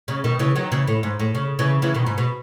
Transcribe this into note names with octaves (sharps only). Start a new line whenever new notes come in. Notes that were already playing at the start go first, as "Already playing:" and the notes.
C#3
B2 D#3
C#3 E3
D#3 F#3
C#3 E3
A2
G#2
A2
C#3
C#3 E3
C#3 E3
B2 D#3
G#2
B2